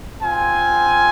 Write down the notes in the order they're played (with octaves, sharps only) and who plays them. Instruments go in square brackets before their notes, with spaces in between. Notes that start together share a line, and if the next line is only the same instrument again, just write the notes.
[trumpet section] C4 F4 G#5